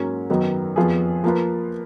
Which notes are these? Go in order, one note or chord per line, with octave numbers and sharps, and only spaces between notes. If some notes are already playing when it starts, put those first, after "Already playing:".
Already playing: G#2 F#3 A#3 C#4
F#2 D#3 F#3 B3 D#4
F2 F3 B3 F4 G#4
F3 A#3 F4 B4